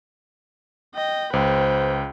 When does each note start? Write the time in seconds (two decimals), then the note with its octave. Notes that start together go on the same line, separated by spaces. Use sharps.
0.95 D#5 G5
1.33 C#2 B4 C5 G5